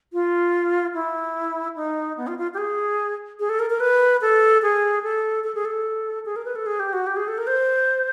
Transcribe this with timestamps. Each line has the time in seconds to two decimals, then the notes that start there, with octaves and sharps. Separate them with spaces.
0.13 F4
0.94 E4
1.76 D#4
2.17 B3
2.27 F4
2.38 F4
2.54 G4
2.58 G#4
3.40 G#4
3.49 A4
3.59 A#4
3.70 A#4
3.80 B4
4.21 A4
4.62 G#4
5.03 A4
5.44 A4
5.55 G#4
5.65 A4
6.25 G#4
6.36 A#4
6.45 B4
6.55 A4
6.66 G#4
6.80 G4
6.93 F#4
7.07 G4
7.17 G#4
7.28 A4
7.38 A#4
7.47 C5